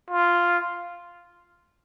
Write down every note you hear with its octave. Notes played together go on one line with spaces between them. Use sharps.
F4